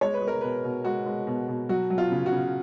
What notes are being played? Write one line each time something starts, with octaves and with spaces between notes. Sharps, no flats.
G#3 C#5
B4
G#3
A#4
B2 B4
B2
G#3 F#4
G#3
B2
B2
F#3 F#4
F#3
F4
C#3
F#4
C#3